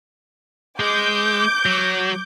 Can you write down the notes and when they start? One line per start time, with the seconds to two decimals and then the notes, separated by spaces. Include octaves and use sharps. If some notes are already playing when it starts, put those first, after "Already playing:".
0.80 G#3 D6 G6
1.66 F#3